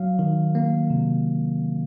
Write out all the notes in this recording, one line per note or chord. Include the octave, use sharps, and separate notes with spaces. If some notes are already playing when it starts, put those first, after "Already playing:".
Already playing: F#3 F5
D#3
A#3
C3